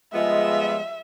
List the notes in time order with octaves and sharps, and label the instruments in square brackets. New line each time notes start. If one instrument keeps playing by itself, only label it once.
[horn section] F3 G3 G#3 [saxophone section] B3 F4 [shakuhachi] D#5 [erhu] E5